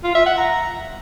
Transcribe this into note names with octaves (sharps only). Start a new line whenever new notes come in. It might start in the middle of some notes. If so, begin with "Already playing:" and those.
F4
E5
F#5
A#5